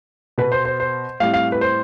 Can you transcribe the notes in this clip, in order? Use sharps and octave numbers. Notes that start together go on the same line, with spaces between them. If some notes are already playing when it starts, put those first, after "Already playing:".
B2 B3 B4
C5
C5
C5
A2 G3 C4 F5
F5
B4
C5